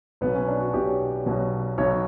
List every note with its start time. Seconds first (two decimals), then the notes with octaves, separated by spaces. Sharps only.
0.21 B1 B2 F#3 B3
0.35 C#4
0.48 D4
0.61 F#4
0.73 B1 B2 F#3 G4
1.26 B1 B2 F#3
1.78 B1 B2 F#3 C#5